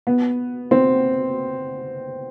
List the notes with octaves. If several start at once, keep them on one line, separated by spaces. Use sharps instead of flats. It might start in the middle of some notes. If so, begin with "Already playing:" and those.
B3
C4